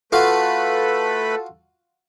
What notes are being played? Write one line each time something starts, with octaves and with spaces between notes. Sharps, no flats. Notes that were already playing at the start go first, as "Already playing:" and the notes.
A3 F4 F#4 A4 B4 F5